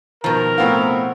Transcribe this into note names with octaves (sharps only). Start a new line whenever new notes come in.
B2 D#3 F3 A#4 A#5
A2 B3 C4 F4